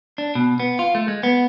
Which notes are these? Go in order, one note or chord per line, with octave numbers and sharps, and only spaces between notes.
D4
B2
B3
F4
A3
G#3
B3